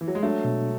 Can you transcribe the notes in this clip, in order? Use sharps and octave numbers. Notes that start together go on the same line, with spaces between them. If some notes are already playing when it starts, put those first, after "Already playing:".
E3
F#3
G#3
F#3 A3 D4
B2